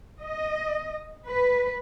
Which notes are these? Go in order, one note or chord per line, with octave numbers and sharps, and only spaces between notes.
D#5
B4